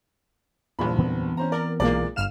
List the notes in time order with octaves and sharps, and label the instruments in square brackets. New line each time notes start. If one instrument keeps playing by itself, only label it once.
[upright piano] F#1 G2 B5 [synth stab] E2 A#2
[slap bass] E3 B3 C4
[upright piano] C#4 C5 A#5
[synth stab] A#4 [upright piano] D5
[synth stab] B1 A#3 [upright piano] A#2 G#3 D5
[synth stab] G1 F6 E7 [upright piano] F5